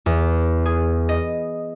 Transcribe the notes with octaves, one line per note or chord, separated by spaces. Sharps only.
E2
G#4
D#5